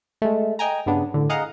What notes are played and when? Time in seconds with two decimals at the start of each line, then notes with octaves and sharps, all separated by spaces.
0.22 G#3 A3
0.59 D#5 G5 G#5 A#5
0.86 G2 C#3 B3 D4
1.14 A2 D3
1.29 G#4 D#5 F5 F#5 A#5